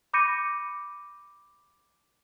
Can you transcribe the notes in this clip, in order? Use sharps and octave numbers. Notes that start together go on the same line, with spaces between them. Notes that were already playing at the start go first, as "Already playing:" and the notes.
B5 D6 G6 A#6 C#7 D#7